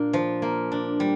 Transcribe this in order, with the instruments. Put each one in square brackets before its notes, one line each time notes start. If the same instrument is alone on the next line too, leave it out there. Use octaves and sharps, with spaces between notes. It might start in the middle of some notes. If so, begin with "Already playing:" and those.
Already playing: [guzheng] A#2 A#3 D4
F3
A#3
D4
G3